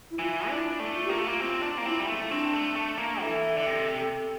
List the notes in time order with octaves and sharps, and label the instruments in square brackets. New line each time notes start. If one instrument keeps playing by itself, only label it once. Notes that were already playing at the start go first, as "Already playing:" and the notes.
[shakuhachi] E4
[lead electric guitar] E3 [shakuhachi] F4
[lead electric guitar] D4 [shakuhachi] E4
[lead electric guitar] A3
[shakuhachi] F4
[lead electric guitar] A#3 [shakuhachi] G4
[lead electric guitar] A3 [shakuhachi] F4
[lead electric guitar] A#3
[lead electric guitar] C4 [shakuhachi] F4
[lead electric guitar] D4
A#3
[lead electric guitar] C4 [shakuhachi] E4
[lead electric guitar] G3
A3
[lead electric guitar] C4 [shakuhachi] D4
[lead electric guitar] A3
A3
A#3
[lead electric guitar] E3 [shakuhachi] A4
[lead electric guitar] D3
C3